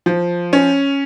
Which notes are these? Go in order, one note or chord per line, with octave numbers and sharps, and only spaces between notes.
F3
C#4